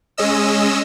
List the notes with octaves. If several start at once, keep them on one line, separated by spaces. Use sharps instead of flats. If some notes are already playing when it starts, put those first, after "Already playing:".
G#3 C#4 D#5 E6